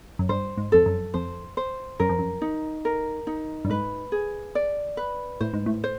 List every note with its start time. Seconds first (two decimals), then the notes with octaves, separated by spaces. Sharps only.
0.19 F#2
0.29 G2 C5
0.57 G#2
0.72 F2 A4
0.86 F#2
1.14 F2 C5
1.57 C5
2.00 F#2 A#4
2.09 F2
2.19 F#2
2.42 D#4
2.85 A#4
3.27 D#4
3.65 G2
3.70 G#2 B4
4.12 G#4
4.55 D5
4.97 B4
5.41 A2 C5
5.54 G#2
5.66 A2
5.84 C5